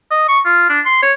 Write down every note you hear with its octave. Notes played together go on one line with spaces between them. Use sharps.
D#5
C#6
F4
D4
C6
C#5